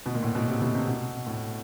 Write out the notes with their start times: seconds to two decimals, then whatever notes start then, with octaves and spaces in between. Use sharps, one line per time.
0.06 B2
0.15 A#2
0.23 A2
0.35 B2
0.49 C3
0.61 B2
0.74 C3
0.87 B2
1.26 A2